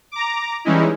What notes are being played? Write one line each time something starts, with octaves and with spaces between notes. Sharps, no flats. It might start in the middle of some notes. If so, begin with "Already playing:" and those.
A#5 D6
E3 G3 G#3 C#4 D#4 E4